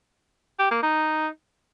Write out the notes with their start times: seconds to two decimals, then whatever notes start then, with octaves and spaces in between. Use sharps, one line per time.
0.59 G4
0.71 A#3
0.83 D#4